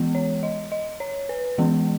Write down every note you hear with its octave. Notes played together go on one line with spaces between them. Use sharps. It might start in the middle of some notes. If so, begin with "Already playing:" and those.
Already playing: E3 G#3 B3
C#5
D#5
D#5
C#5
B4
E3 G#3 B3